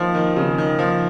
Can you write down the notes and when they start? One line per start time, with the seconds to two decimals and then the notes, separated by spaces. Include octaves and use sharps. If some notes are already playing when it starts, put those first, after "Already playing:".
Already playing: D#3 F3
0.15 D#3
0.36 C#3
0.58 D#3
0.79 F3